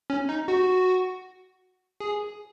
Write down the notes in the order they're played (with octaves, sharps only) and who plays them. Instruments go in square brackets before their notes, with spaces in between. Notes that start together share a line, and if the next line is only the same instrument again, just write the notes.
[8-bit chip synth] C#4
D#4
F#4
G#4